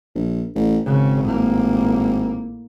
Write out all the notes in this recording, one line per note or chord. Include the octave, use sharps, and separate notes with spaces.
A#1
A1
G#1 C#3
A2 A#3